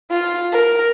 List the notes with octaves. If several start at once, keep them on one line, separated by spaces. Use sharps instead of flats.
F4
A#4